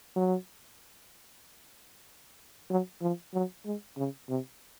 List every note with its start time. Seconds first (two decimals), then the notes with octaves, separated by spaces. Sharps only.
0.16 F#3
2.70 F#3
3.02 F3
3.34 F#3
3.65 G#3
3.97 C#3
4.29 C3